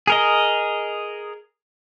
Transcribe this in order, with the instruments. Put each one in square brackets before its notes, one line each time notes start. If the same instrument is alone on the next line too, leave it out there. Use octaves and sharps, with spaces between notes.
[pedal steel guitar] G#4 A#4 D#5